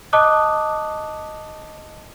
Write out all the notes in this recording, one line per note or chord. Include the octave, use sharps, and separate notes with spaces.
D#5 A5 D6 D#6 F#6